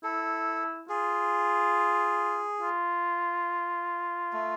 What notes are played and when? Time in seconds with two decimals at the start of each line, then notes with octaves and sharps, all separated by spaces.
0.04 E4 A4
0.89 F4 G#4
2.61 F4
4.33 A3